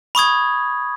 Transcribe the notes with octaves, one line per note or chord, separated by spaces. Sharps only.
B5 C#6 D#6 G#6